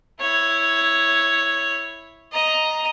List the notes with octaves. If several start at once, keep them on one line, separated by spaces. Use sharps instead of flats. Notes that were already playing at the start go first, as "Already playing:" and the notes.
E4 C#5
D#5 A#5